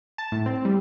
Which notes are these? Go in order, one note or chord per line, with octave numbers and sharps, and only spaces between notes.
A5
A2
C4
G3